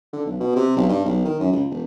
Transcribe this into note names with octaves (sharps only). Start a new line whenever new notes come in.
D3
B1
B2
C3
B1
G2
B1
D#3
F#2
C#2
E1